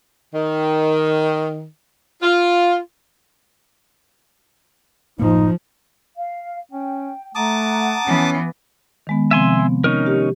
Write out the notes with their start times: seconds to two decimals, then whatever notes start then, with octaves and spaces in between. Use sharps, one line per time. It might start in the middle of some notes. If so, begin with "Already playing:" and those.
0.34 D#3
2.23 F4
5.19 F#1 A2 F3 A#3 D#4
6.16 F5
6.72 C#4 G5
7.35 A3 F#5 A5 A#5 D6 D#6
8.07 E3 B3 C#4
9.07 D#3 G#3 B3
9.31 C3 F3 C4 E5 G#5 C6
9.59 B3
9.84 C#4 D#4 A#4
10.06 G4